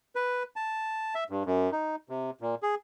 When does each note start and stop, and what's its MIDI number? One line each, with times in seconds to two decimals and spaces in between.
0.15 0.43 71
0.56 1.14 81
1.15 1.24 76
1.30 1.43 43
1.46 1.70 42
1.72 1.96 63
2.09 2.31 48
2.41 2.55 46
2.63 2.75 68